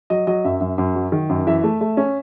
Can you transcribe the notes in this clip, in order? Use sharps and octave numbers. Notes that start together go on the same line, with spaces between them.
F#3 D#5
F#3 D#5
F#2 E5
F#2
F#2
F#3
D#3
F#2
E3 E5
A3
A3
C#4